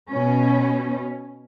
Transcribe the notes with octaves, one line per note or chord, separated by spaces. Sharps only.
B2 C#4